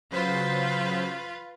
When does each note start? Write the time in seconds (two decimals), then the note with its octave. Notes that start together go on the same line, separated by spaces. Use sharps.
0.11 C#3 F#3 F4 B4 C5